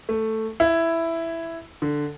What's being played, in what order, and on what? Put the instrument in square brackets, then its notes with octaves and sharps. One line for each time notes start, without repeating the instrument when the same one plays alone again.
[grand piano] A3
E4
D3